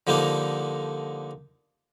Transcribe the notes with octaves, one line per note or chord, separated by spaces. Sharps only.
D3 F3 G3 A#3 D4 D#4